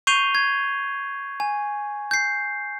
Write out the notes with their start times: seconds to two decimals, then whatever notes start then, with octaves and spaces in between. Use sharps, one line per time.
0.07 C#6 G6 C7 D#7 F7 G7
0.35 G#6
1.40 G#5
2.11 G6 C7